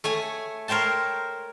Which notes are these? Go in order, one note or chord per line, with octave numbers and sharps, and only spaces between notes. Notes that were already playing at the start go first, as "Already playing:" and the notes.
A3 C#5 G#5
A#4 C5 C#5 G5 A5